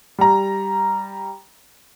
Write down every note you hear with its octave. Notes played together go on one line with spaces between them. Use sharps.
G3 A#5